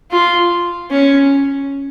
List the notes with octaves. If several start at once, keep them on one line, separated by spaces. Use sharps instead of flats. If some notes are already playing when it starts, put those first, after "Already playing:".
F4
C#4